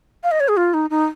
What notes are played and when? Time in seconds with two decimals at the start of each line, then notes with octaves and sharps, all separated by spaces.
0.24 F5
0.31 D#5
0.40 C#5
0.48 G#4
0.57 F4
0.74 D#4
0.90 D#4